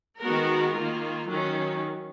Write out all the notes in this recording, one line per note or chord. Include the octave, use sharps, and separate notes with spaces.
D#3 G#3 B3 F#4 A#4
D#3 A#3 F4
D#3 F#3 C#4